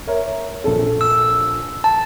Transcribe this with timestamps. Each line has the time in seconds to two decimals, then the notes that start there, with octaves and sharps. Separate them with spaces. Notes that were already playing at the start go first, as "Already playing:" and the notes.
0.07 A#4 C#5 E5
0.64 A#1 A4
1.01 E6
1.84 A5